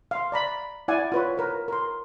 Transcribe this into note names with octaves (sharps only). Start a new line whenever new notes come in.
F5 C6
D5 A#5 B5
E4 D5 F#5 G#5
F4 B4 C#5
A#4 B4
A#4 C6